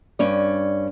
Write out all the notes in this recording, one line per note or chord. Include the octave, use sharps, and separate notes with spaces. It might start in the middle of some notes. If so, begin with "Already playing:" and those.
G2 C#4 D5